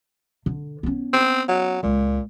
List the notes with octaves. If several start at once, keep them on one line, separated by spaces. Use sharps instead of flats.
D3
B3 C#4
C4
F#3
C#2 A#2